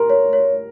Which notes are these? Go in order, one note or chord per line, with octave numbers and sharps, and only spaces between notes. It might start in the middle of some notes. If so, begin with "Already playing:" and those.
Already playing: A#4 C6
C#5
C#5